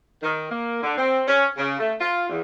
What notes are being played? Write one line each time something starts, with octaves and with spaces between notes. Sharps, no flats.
D#3
A#3
D3
C4
C#4
C#3
A3
F4
E2